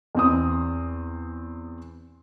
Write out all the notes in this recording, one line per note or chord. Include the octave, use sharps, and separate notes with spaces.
E2 C4 D#6